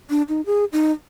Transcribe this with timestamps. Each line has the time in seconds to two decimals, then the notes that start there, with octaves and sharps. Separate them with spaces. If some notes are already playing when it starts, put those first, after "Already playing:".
0.10 D4
0.29 D#4
0.46 G#4
0.73 D#4